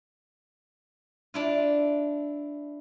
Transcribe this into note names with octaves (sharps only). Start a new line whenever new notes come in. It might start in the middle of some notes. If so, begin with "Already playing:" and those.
D4 E4 F4